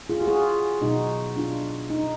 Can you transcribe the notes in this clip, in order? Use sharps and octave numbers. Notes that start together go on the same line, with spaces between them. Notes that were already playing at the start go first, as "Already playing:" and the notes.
F4 G#4
F#4
F4 G#4
B2 F#3 B3 D#4 F#4
D4 F4
D#4